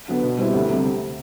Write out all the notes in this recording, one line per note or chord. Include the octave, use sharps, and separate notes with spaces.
D3 F#3 B3 D4
B2
G3 C4 E4
D2
C3 G3